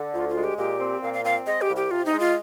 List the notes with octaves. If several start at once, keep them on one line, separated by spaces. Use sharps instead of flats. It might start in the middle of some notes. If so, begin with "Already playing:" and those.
Already playing: D3
D2 F4
F4
G#3
G4
A#2 G4
C4
A#2 F5
F5
C4 F5
G#3 D#5
G4
C2
G4
C3 F4
D#4
G#3
F4